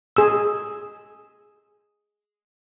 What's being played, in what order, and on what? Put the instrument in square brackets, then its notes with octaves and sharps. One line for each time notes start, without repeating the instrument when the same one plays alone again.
[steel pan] G#4 E6